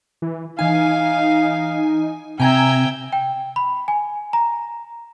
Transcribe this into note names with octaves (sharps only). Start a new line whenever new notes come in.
E3
E3 D#4 F5 G#5
C3 E5 G5 G#5 A#5 G#6
G5
B5
G#5
A#5